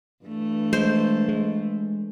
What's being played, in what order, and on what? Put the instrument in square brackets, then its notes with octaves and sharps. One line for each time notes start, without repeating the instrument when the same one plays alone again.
[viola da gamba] G2 E3 A3
[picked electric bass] G#3 [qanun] C5
[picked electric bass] G#3